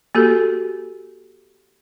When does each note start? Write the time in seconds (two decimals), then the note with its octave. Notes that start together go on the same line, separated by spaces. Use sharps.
0.15 A#3 F#4 G4 A4